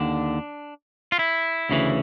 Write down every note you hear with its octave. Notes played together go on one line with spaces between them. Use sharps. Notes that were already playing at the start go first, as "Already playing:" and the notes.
Already playing: D#2 D3 D4
F4
E4
D2 C#3 E3